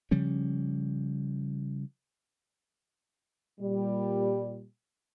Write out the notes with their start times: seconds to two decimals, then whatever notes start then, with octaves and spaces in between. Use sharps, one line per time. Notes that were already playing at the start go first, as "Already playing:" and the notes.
0.11 C#3 F3 G3 C#4
3.60 A#2 G3